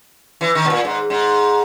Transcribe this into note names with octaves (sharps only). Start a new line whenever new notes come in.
E3
D#3
B2
A#2
G#2
G#2